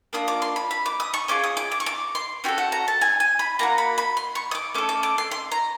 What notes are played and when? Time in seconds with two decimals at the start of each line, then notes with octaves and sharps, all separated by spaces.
0.13 A#3 D4 F4 D#6
0.28 D6
0.42 C6
0.56 B5
0.71 B5
0.86 D6
1.00 D#6
1.14 C#6
1.28 C#4 F4 G#4 D6
1.44 D#6
1.57 D6
1.72 D6
1.80 C#6
1.86 D6
2.15 C6
2.44 C#4 F#4 A4 G5
2.58 F#5
2.72 A#5
2.88 A5
3.01 G#5
3.20 G#5
3.39 B5
3.59 A#3 D4 F#4 A#5
3.78 B5
3.98 B5
4.17 C6
4.35 C#6
4.51 D#6
4.55 D6
4.74 A3 C#4 A4 D6
4.89 D6
5.03 D6
5.18 C6
5.31 C6
5.52 A#5